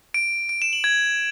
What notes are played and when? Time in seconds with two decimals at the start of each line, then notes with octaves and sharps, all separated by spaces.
0.14 D7
0.49 D7
0.62 E7
0.73 F#7
0.84 G#6